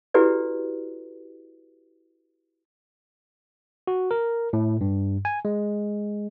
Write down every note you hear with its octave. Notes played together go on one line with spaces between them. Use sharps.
E4 F#4 G4 A4 B4 D5
F#4
A#4
A2
G2
G#5
G#3